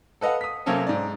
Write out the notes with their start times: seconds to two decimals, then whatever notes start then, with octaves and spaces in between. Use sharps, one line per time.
0.21 A4 B4 D#5 F5 F#5
0.41 D#6 B6
0.66 C3 F#3 A#3 C4 C#4 A4
0.87 G#2 D5